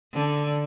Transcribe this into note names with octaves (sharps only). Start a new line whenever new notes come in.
D3